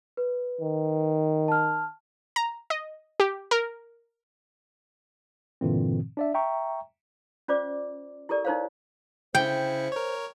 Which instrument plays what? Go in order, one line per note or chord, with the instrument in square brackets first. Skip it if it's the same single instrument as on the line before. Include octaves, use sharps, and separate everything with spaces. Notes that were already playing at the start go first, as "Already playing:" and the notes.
[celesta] B4
[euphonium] D#3
[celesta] A5 F6
[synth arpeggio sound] A#5
D#5
G4
A#4
[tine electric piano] G2 A#2 D3 E3 C4
D4 D5 E5
E5 G5 A#5 C#6
[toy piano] C#4 F4 C5 D5 D6
E4 G4 A4 A#4 D5
D#4 E4 A#4 C5 C#5 F5
[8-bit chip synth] C#3 E4 C#7 [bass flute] C5 [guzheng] G5
[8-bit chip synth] A#4 C#5